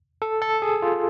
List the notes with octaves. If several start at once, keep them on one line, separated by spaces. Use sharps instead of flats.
A4
A4
G#4
F4